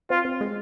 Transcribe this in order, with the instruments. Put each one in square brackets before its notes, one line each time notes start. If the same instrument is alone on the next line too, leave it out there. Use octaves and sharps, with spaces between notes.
[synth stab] C4 [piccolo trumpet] F4
[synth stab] C4
G#3